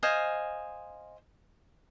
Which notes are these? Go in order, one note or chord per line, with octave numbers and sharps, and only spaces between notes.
C5 D#5 F5 G#5